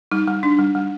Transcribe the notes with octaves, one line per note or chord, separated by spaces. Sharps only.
G3 D#4
G3
D4
G3
G3